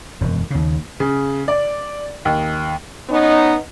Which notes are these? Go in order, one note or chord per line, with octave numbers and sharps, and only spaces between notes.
E1 F#2
D#2 C#3
C#3
D5
D#2
B3 C#4 D#4